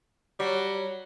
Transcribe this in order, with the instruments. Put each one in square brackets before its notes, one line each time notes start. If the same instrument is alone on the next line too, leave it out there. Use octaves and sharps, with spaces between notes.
[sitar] F#3 [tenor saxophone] G3